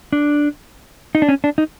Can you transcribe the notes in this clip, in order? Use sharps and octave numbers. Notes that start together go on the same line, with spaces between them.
D4
D#4
D4
C#4
D4
D#4